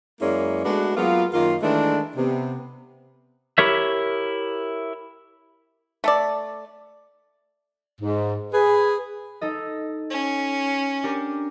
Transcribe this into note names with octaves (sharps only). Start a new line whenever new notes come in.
F#2 G#3 A#3 C#4 E4 D5
G#3 A3 B3 D4 F#4
F#3 G#3 A#3 B3 F4
F#2 D#3 A#3 F4
D#3 E3 G#3 A3 D4
C3 B3
E4 G4 A#4 C#5 E5
A3 A4 D5
G#2
G#4 B4
D#4 A4 D#5
C#4
D4 G4 A#4